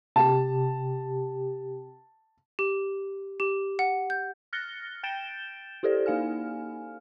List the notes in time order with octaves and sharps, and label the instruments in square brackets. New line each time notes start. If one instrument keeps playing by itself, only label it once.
[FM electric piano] C3 G4 [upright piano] A5
[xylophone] G4
G4
F#5
G6
[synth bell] F6 F#6 A6 A#6 C#7 G7
G5 G6 A6 D7 E7 G7
E4 G4 A4 C5 D5
A#3 D#4 F5 G#5 F6